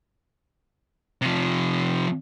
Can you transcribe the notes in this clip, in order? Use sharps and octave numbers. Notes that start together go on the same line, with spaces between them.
C3 F3